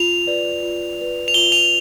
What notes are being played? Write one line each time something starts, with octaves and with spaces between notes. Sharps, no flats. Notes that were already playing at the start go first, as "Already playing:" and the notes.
Already playing: F4 F7
B4 D5
F4
B4 D5
F7
F4 G7
F7